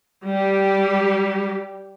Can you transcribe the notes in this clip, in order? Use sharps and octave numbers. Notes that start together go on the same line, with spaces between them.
G3 G4